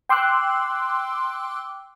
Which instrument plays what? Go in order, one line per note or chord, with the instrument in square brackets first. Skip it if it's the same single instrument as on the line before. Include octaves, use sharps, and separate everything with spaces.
[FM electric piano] G5 C6 D6 E6 F#6